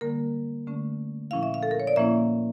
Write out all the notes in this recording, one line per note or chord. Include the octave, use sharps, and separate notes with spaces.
D3 G3 A#3 A#4
D3 A3 C#4
A#2 F3 C#4 E4 F5
E5
F5
A4
A#4
C#5
D5
A#2 F3 A#3 C#4 E4 E5